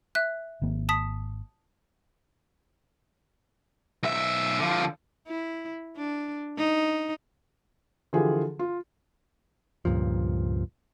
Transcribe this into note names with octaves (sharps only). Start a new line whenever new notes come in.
E5 F#6
G#1 D#3 A#3
A5 D#6 B6
B1 E5
D3 F3
E4
D4
D#4
D3 E3 F3 F4 G4 G#4
F4
C#2 G2 A#2 F3